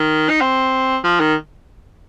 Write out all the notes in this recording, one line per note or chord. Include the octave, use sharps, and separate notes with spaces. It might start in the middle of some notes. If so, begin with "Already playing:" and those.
Already playing: D#3
D#4
C4
F3
D#3